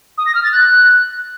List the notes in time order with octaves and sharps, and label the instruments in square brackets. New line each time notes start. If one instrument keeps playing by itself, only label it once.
[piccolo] D#6
A#6
F6
A6
F#6